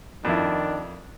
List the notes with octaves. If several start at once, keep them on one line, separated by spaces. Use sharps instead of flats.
F2 D#3 D4 E4